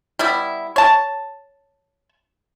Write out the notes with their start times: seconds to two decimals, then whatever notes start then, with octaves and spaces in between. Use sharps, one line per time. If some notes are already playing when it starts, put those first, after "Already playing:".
0.19 G3 B3 E4
0.76 C#5 A5